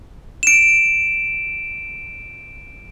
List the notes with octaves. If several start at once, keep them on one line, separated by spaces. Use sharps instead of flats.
D7 E7